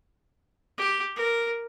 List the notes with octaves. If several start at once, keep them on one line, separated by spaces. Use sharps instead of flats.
G4
A#4